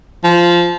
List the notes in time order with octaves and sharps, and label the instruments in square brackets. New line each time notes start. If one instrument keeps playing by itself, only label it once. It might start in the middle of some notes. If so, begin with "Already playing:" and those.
[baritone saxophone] F3